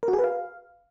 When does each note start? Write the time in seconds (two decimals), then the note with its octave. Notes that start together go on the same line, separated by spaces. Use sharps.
0.03 A#4
0.08 F#4
0.13 G#4
0.19 B4
0.24 F5